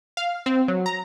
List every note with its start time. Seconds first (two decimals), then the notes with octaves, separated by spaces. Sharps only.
0.17 F5
0.46 C4
0.68 F#3
0.86 A#5